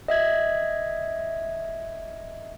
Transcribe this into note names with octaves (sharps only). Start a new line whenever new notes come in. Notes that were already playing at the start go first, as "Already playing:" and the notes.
D#5 E5 G#6